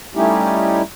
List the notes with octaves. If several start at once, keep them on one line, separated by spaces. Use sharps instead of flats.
G3 A3 C#4 D#4 E4 G4